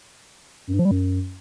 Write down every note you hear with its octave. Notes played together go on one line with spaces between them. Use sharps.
F#2
G2
F3
G3
F#2